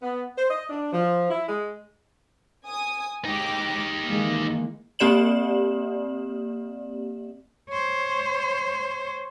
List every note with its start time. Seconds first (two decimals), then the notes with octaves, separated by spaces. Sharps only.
0.02 B3
0.37 C5
0.50 D#5
0.69 D4
0.91 F3
1.29 E4
1.48 G#3
2.66 G#5 D#6
3.25 G#3 D#4 G4 G5 D6
4.07 D#3 E3 G#3 A#3
4.99 A#3 C4 G4 D5 E7 F#7
7.69 C5 C#5